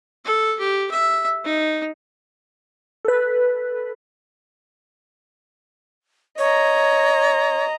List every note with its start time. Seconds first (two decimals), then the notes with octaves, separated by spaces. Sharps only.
0.25 A4
0.59 G4
0.91 E5
1.44 D#4
3.05 A4 B4
6.38 C#5 D#5 A#5